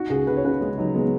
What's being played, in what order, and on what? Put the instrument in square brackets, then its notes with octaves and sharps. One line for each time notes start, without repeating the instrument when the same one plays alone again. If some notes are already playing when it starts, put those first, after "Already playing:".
Already playing: [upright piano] D#4 [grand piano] F#4
[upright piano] C#2 [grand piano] G#4
[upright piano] D#4 [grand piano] B4
[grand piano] C#5
[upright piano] C#3 [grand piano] B4
[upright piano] C#3 [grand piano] G#3
[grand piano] F#3 [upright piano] D#4
[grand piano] G#3 [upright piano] B3